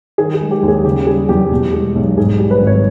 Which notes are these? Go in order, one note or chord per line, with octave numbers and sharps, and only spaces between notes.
D#3 G#4
G#4
G#3
G4
D#2
G#4
C#3 G4
G3 G#4
E2 G4
B2
G#3
B1
G#2 G#4
G3
B4
G#1
C#5